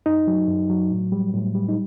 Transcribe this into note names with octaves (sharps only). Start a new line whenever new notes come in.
F#2 D#4
F#3
F#2
F#3
A2
G3
A2
G3
D#4